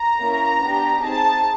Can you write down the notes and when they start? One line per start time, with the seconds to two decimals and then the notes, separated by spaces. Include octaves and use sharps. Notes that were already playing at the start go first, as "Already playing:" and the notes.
Already playing: A#5
0.21 A#3 C#4 E4
0.61 B3 D4 G4
1.01 C4 D#4 G#4 A5